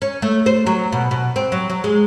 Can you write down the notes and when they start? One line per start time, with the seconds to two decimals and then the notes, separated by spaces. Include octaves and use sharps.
0.02 C#4
0.22 A3
0.46 C5
0.66 F#3
0.92 B2
1.11 B2
1.36 C4
1.52 F#3
1.70 F#3
1.84 G#3